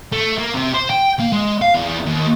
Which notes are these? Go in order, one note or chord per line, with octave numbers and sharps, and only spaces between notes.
A3
A#3
C3
C5
G5
A#3
G#3
F5
E2
D#2